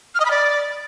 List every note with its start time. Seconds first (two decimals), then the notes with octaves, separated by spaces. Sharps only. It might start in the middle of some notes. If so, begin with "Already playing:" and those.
0.15 F6
0.20 D#5
0.25 B5
0.31 D5